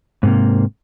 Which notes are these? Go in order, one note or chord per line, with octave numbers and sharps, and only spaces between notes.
G#2 C3 A#3